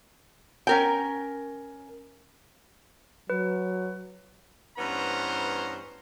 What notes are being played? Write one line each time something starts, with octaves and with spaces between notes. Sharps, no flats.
C#4 A#4 G5
F#3 B4
G2 E3 B3 C#4 C5 A#5